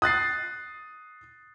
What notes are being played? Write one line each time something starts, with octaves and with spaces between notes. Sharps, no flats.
D#6 F#6 A6 C7